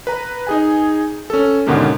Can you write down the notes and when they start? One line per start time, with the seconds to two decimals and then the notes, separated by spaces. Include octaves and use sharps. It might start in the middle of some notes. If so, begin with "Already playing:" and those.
0.07 B4 A#5
0.47 D#4 G#4 G#5
1.30 C#4 A4
1.67 D#2 G#2 B2 D3 A#3 C#4